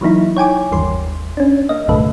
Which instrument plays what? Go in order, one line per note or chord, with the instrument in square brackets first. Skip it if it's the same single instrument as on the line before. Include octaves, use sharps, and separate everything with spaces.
[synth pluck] E3 F#3 A#3 D#4 E4
C#5 G5 G#5 D6
G1 D#2 E3 G3 C6
C#4 D4
A#3 D#5
C2 G2 A#2 D3 A3 B4